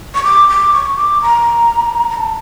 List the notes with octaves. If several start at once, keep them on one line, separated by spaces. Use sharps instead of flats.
C#6
D6
D6
C#6
D6
A#5
A#5
A5